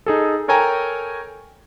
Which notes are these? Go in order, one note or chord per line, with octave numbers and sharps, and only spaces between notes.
D#4 G#4 A4
A4 A#4 C#5 G5 G#5 A#5